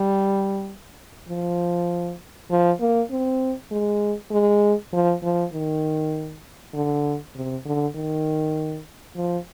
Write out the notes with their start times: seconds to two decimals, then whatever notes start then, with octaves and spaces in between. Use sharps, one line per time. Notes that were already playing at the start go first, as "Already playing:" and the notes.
Already playing: G3
1.29 F3
2.50 F3
2.80 A#3
3.10 C4
3.71 G#3
4.31 G#3
4.93 F3
5.23 F3
5.53 D#3
6.74 D3
7.35 C3
7.66 D3
7.95 D#3
9.17 F3